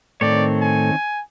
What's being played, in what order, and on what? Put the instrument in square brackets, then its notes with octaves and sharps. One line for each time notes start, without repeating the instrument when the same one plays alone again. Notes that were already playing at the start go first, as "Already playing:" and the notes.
[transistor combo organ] A2 A3 [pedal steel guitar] D#3 C4 C#5 [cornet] D5
[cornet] G#5